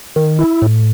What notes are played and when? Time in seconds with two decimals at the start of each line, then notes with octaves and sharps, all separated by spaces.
0.16 D#3
0.39 E4
0.62 A2